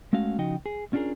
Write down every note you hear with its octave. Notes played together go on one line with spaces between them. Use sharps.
G#3 A3 C#4 F#4 F5
C#3 F3 D#4 F#4 D#5 G5
G#4
C#4 D4 F4 G4 G#4 A#4